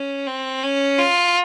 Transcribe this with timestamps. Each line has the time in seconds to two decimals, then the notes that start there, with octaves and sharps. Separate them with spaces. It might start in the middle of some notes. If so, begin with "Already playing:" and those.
Already playing: C#4
0.27 C4
0.63 C#4
0.98 F4